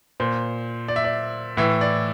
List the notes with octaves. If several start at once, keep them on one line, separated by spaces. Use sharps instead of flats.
A#2 C5
D5
E5
D5
A2 E3 E5
D5